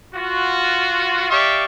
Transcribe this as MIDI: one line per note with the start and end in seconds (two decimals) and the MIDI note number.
0.14 1.27 65
0.14 1.27 66
1.30 1.65 67
1.30 1.65 74
1.30 1.65 76
1.30 1.65 77
1.30 1.65 85